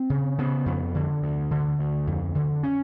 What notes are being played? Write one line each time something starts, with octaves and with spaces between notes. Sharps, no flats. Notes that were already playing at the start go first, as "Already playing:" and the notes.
Already playing: C4
C#3
C#3 B3
F2
D3
D2
D3
D2
F2
D3
C#4